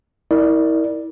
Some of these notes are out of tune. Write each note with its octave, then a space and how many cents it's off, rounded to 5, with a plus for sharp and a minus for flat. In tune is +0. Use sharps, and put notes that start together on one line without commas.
E4 -35 A#4 +0 D5 +0